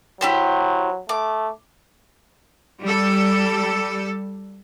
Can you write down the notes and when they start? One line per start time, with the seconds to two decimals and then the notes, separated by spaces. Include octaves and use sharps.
0.21 F#3 E4 G4 C5
1.09 A3 D6
2.84 G3 A4